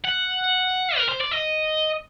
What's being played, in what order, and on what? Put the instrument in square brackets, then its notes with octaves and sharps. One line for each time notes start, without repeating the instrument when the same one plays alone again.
[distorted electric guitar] F#5
A#4
C5
D5
D#5